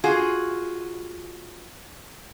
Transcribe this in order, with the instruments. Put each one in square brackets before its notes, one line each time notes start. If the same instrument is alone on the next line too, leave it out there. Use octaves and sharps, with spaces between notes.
[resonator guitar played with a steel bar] F4 F#4 G#4